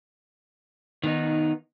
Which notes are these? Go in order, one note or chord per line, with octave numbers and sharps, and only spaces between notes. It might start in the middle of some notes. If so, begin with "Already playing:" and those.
D#3 B3 D#4